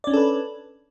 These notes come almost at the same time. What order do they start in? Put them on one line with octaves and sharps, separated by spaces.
D5 C#4 D4 A4 B4